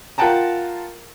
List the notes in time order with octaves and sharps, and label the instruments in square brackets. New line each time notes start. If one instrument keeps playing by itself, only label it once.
[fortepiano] F4 A#4 F#5 G5 A5 A#5